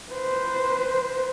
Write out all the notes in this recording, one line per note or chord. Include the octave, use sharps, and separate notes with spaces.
B4 C5